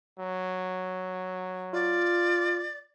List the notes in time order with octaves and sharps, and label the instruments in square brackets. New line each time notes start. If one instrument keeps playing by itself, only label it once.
[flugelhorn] F#3
[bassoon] F4 [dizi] D5